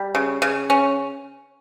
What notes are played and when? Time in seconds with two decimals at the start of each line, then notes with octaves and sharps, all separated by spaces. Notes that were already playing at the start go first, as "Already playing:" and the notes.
Already playing: G3
0.15 C#3
0.42 C#3
0.70 C#4